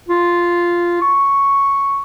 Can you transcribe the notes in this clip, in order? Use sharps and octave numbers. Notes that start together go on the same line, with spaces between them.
F4
C#6